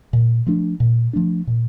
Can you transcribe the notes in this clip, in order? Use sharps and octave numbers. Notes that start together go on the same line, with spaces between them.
A#2
F3 A3 D4
A#2
F3 A3 D4
A#2